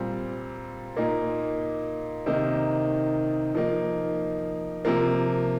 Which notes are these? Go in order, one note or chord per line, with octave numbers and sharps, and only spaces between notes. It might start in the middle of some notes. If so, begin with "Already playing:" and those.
Already playing: A#2 G3 C4
A#2 A#3 D#4
C3 D#3 A#3 D#4
F3 A#3 D#4
C3 F3 A#3